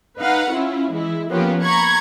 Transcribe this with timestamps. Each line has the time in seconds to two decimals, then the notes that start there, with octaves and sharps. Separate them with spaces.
0.20 D#4 B4 F5 F#5
0.52 C#4 E4 F4
0.93 E3 G#3 E4
1.29 F3 A#3 B3 C#4 F4 G4
1.62 A#5 B5 C#6 G#6